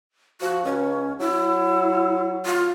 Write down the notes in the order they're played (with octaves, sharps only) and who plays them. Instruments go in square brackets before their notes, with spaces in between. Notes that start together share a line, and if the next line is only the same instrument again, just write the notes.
[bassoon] F3 [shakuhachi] F#4
[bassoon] C#2 [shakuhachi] C#4
[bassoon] F#3 [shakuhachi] E4
[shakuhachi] F4